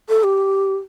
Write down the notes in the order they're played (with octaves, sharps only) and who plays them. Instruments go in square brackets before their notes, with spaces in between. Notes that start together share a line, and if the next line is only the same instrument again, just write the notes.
[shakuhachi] A4
G4